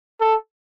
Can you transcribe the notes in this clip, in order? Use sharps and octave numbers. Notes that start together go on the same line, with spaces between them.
A4